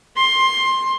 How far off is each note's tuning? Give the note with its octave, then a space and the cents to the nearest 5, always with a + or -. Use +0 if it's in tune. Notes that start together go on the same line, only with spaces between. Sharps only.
C6 +15